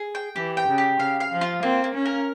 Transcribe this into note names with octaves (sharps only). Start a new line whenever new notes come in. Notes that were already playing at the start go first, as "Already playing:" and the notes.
Already playing: G#4
G5
E3 G4
G5
C#3
G4
C#3 F5
F5
F3
F4
A#3 C4
A#3
C#4
A#4